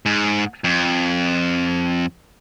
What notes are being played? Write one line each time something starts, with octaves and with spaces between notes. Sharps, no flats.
G#2
F2